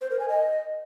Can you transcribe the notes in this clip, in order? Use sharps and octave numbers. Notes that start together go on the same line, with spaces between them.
C5
A#4
G#5
D#5